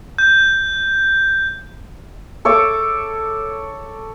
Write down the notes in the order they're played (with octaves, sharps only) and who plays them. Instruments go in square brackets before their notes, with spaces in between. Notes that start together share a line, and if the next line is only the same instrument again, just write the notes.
[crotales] G6
[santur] A4 C#5 C#6 D6